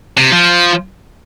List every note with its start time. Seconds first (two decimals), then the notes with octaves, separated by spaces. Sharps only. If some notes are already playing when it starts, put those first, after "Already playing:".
0.17 C3
0.32 F3